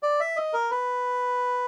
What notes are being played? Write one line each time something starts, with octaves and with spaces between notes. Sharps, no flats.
D5
E5
D#5
A#4
B4